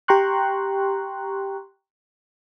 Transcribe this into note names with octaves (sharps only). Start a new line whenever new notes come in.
G4 G5 A#5 C6 C#6 F#6